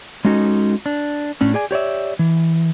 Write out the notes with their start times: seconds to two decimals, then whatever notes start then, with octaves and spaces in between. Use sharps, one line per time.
0.25 G#3 C#4 D#4 F#4 A4
0.86 D4
1.41 A2 C#4 D4
1.54 G#4 D5 G#5
1.71 G4 C#5 D5 E5
2.19 E3